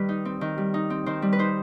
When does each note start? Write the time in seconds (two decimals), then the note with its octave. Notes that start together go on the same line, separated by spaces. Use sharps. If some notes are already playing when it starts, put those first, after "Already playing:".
Already playing: D#3 G3 B4
0.09 D#4
0.25 C4
0.41 D#3
0.58 G3
0.74 D#4
0.90 C4
1.06 D#3 C5
1.22 G3
1.33 B4
1.39 D#4 C5